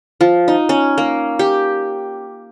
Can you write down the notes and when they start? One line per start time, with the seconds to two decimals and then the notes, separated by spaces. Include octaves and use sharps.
0.21 F3
0.48 D#4
0.69 C#4
0.98 A#3
1.39 G4